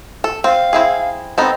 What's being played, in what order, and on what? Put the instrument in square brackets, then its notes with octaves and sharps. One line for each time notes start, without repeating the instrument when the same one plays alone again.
[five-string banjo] A4
[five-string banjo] C4 [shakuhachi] F5
[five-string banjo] C4 E4 G#4
[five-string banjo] B3 D#4 A4 [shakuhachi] C4